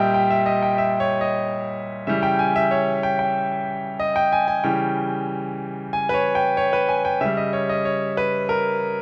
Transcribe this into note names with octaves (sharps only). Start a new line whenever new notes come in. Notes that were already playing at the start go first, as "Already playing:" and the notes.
Already playing: A#2 G3 D#5 E5 G5
G5
E5
D#5
G5
E5
C#5
D#5
C#3 E3 G3 E5
G5
G#5
E5
C#5
G5
G5
D#5
G5
G#5
G#5
C#3 E3 G3 G5
G#5
B4
C#5
G5
C#5
B4
G#5
G5
C#3 G3 E5
D#5
C#5
D#5
C#5
B4
A#4